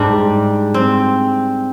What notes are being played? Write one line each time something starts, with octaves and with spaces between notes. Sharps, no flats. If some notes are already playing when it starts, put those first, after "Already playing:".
Already playing: G#2 G3 D4
C4